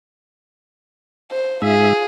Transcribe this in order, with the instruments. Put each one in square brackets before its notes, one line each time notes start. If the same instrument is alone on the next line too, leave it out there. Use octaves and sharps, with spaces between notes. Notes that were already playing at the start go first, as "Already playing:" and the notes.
[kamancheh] C5
[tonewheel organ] G#2 E5 [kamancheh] F4 G#4